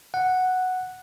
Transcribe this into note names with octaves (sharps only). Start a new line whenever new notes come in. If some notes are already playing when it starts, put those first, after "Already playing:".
F#5